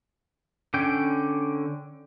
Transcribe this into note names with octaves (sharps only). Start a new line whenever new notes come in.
D3 C#4 G5